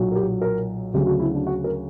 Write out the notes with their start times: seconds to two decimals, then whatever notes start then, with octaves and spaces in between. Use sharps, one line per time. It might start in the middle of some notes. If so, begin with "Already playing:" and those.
Already playing: B1 A#2 F#3
0.12 A#4
0.15 G4
0.42 A#4
0.94 D2 C#3 F#3 G4
1.07 F#4
1.20 E4
1.34 D4
1.47 F#4
1.64 A#4